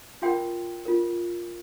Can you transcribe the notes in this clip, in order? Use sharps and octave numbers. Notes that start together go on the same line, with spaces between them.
F4 A#4 G5 C6
F4 A#4